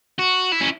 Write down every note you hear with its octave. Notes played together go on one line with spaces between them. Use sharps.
F#4
E4
C#4